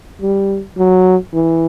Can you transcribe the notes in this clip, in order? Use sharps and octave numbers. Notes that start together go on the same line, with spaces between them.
G3
F#3
E3